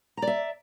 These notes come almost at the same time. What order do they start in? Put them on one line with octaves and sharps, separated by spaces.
A#5 D5 E5